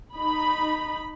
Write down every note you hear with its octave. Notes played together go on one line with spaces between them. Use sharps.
D#4 B5